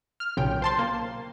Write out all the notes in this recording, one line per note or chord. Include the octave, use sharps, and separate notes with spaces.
F6
B1 A#2 C#3 G5
C5 A5 C6
A#3